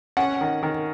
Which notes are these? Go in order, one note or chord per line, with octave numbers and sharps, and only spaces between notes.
C#4 F#5
D#3
D#3